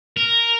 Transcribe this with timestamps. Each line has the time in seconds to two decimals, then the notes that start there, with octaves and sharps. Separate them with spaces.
0.17 A#4